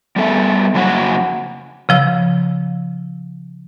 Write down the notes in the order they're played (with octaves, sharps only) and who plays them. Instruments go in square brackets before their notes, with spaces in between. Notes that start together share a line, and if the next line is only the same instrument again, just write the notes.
[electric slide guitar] G3 B3 A4 E5
F2 C#3 F#3 A#3 C#5 F#5
[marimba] C#3 F3 E6